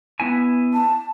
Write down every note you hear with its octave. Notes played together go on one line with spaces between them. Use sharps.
B3 E4 G#5
A5